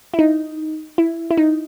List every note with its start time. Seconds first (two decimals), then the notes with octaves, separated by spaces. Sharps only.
0.14 E4
0.19 D#4
0.98 E4
1.31 E4
1.37 D#4